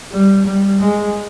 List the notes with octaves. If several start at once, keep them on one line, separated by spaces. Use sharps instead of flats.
G3
G3
G#3